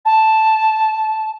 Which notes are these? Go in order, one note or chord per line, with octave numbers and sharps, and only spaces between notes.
A5